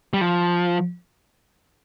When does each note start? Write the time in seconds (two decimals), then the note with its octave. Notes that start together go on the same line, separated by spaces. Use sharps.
0.13 G3
0.21 F3